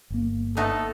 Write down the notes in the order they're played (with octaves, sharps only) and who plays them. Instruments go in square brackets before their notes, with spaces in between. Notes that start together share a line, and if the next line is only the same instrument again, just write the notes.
[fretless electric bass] G1 A#3
[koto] A3 B3 D#4 [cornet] A4